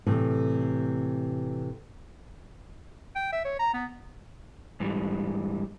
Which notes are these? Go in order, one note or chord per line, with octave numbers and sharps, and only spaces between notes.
A2 C3 E3 A3
G5
E5
C#5
A#5
B3
G#2 E3 G3